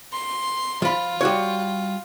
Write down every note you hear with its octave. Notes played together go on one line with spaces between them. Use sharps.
C6
F3 F4 B5
G3 F#4 C#5